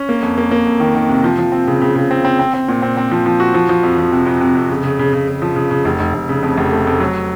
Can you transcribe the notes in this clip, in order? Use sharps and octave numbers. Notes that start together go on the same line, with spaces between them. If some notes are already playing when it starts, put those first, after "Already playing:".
Already playing: C#4
A#3
F2
A#3
A#3
F2
D#3
D#3
C3
F3
F3
C4
C#3
C#3
C#3
C4
C4
C4
C4
A#2
C4
C4
F3
F3
F#4
F3
F3
F2
F3
C3
F2
C3
F2
C#3
C#3
C#3
C#3
C#3
F3
C#3
C#3
F1
F1
F1
C#3
F2
F1
A3
F2
F#3